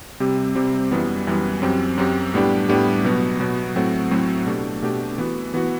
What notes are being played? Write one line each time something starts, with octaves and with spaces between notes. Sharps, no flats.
C3 G3 C4 G4
C3 G3 C4 G4
F#2 E3 G3 B3
F#2 E3 G3 B3
F#2 F#3 C4 G4
F#2 F#3 C4 G4
A2 G3 B3 D4 G4
A2 G3 B3 D4 G4
B2 F#3 B3 F#4
B2 F#3 B3 F#4
A2 F#3 A3 C4 F#4
A2 F#3 A3 C4 F#4
B2 A3 D4 G4
B2 A3 D4 G4
E3 B3 F#4
E3 B3 F#4